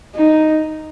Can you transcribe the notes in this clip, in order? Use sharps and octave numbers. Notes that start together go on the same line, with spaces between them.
D#4